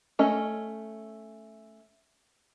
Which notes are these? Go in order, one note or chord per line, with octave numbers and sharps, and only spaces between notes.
A3 C#4 D#5